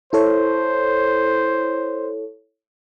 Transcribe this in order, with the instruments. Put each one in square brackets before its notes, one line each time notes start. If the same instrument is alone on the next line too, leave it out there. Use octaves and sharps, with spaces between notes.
[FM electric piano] E4 A4 C#5 [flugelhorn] C5